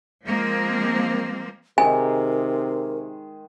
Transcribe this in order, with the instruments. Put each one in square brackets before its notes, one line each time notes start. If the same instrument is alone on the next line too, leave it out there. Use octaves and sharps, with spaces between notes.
[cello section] F3 G#3 A#3 C4
[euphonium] C3 [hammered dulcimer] D#3 G#3 G#4 [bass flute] A#4 [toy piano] G#5